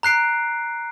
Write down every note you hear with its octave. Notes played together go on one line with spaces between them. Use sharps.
A#5 F#6 C7 D7